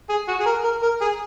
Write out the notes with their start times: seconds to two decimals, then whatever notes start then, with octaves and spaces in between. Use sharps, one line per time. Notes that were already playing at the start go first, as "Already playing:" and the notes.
0.09 G#4
0.28 F#4
0.40 G#4
0.46 A#4
0.64 A#4
0.83 A#4
1.01 G#4